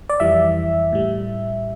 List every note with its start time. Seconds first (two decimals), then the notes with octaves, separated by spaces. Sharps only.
0.09 D5
0.20 F2 E3 G3 E5
0.92 A2 G3